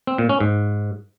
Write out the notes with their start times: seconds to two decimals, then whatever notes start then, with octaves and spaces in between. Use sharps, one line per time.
0.07 C4
0.18 A#2
0.29 C#4
0.40 G#2